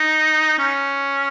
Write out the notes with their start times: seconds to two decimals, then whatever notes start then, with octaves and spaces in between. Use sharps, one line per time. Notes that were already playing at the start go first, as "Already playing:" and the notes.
Already playing: D#4
0.59 C#4